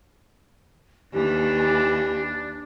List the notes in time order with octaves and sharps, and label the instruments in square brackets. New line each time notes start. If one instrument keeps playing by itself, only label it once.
[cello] D#2 E3 [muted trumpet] D4 [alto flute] G4